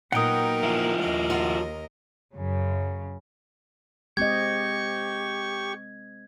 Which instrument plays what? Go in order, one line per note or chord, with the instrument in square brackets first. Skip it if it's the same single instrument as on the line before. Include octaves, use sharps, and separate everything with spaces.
[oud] A#2 F#3 [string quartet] B3 D#4 A#4 [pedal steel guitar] F#5 G5 D#6
[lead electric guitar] F3 E4
[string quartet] D#2 A#4 D#5
[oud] F4 F#4
[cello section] F#2 C#3
[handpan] G#3 C4 D#5 [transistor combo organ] G4 [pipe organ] C#6 [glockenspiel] G#6